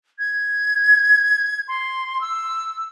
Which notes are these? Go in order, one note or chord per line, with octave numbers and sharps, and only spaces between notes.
G#6
C6
E6